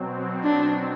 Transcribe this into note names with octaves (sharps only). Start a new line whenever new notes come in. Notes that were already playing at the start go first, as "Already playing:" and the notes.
Already playing: B2 F#3 C4
D4